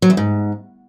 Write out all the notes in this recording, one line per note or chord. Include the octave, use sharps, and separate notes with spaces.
F#3
E2
G#2